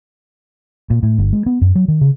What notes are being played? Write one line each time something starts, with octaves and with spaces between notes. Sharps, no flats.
A#2
A2
G1
G#3
B3
F#2
F#3
D#3
C#3